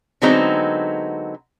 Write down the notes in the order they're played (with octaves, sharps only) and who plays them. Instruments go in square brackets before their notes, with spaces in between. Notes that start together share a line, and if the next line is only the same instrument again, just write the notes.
[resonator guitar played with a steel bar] D3 F#3 G#3 B3 C4 D#4